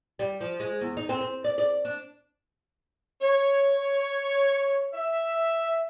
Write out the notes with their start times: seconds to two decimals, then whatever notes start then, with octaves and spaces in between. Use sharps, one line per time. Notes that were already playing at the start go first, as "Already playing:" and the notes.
0.19 G3
0.41 F3
0.60 G#3
0.81 E2
0.97 D#4
1.09 C4
1.21 C4
1.44 D5
1.58 D5
1.85 D4
3.21 C#5
4.93 E5